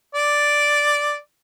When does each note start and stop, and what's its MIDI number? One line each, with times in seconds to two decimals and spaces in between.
0.15 1.18 74